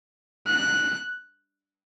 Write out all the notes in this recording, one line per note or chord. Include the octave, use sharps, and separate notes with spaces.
F#6